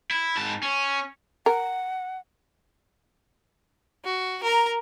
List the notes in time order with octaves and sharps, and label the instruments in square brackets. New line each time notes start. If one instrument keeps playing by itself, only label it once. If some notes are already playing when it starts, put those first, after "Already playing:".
[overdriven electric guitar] E4
G#2 A5
C#4
[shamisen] A#4 [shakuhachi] F#5
[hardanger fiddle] F#4
A#4 A#5